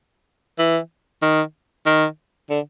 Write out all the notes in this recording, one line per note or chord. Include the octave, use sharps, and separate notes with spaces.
E3
D#3
D#3
D3